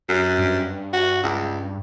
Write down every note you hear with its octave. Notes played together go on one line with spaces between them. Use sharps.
F#2
G2
F#4
C#2